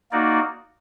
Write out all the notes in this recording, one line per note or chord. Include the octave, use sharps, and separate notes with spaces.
A#3 D#4 F#4 D5